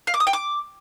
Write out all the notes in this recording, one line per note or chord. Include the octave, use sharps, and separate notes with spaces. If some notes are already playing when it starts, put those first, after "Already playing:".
F5
D6
D#6
G5
D6